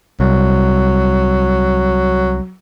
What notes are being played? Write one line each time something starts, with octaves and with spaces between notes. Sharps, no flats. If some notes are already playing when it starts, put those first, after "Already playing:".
C2 F#3